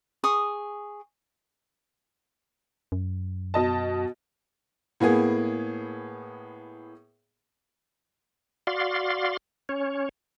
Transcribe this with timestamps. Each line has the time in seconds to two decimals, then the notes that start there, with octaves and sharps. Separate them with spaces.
0.24 G#4 C#6 D#6
2.92 F#2
3.54 B2 D#5 A5
5.00 A2 A#3 B3 G#4
8.67 F#4 D5 F5 C6
9.69 C#4 C#5